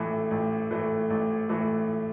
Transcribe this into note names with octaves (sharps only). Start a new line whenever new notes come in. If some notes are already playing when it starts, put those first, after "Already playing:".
Already playing: A1 A2 E3 A3
A1
A2 E3 A3
A1
A2 E3 A3